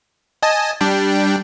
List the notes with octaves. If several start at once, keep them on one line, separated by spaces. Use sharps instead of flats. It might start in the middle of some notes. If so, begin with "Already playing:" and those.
D#5 G#5 A5
G3 D4 G5